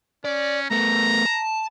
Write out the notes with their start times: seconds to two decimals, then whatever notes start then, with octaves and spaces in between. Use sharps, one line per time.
0.25 C#4 D5
0.71 A3 B3 A#5
1.26 A5